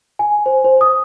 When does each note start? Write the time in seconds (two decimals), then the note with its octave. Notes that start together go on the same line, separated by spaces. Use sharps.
0.19 G#5
0.46 C5
0.64 C5
0.81 D#6